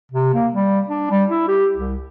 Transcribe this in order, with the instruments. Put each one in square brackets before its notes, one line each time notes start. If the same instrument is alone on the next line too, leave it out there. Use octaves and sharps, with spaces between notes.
[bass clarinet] C3
A#3
G3
D4
G3
E4
G4
C2